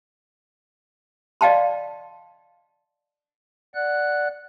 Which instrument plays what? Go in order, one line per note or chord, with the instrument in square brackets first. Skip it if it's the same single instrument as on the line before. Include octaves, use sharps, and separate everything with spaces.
[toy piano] D5 D#5 F5 G5 A5 C6
[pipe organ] D5 F#5 F#6